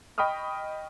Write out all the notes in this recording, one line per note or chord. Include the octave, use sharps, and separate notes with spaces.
D#5 G5 B5 C#6 D#6 F6